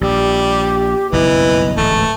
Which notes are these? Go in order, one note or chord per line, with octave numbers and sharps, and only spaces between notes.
A#1 G3 G4
F#1 B1 G2 E3 D#5
D1 A1 G#2 A3